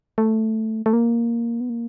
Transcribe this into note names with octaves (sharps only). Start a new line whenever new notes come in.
A3
A3
A#3
B3
A#3